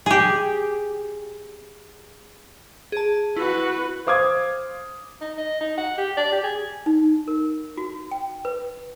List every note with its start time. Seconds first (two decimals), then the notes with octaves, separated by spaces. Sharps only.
0.06 G4 G#4
2.92 G#4 A5
3.37 E4 F#4 B4
4.07 C5 F5 D6 D#6 G#6
5.21 D#4
5.38 D#5
5.61 D#4
5.78 F#5
5.98 G4
6.17 D5
6.32 G4
6.44 G#4
6.86 D#4
7.28 A#4
7.77 F#4
8.11 G5
8.45 B4